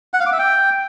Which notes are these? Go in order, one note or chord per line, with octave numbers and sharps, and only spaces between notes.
F#5
F5
D6
E5
G5